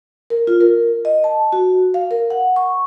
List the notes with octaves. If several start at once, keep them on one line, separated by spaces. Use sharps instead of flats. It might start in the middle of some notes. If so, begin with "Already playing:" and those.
A#4
F4
A#4
D#5
A5
F#4
F5
A#4
F#5
C#6